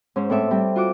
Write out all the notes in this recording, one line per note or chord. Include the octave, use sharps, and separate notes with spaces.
G#2 C#4 C5
A2 C4 A4 D5 E5
G3 C4
F4 F#4 D6